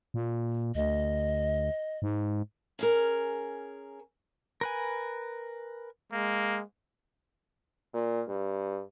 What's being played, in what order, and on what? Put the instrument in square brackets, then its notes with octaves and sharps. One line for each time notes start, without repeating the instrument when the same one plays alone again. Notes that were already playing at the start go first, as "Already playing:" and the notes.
[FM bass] A#2
[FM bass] D2 [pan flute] D#5
[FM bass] G#2
[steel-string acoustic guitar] C#4 G#4 A#4
[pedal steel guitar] A#4 B4 G#5
[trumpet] G#3 [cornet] A#3
[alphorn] A#2
G2